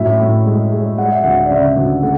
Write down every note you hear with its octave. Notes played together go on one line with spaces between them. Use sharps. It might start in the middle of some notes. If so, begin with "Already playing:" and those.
Already playing: F#2 A2 E5
A2
G#3
G#3
G#3 F#5
E5
D2 F#5
D5
C#3 E5
D2
A3 F#5